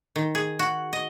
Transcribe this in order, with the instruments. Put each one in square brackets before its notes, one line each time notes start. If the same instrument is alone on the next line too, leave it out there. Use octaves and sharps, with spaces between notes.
[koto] D#3
G#4
F#4
D#5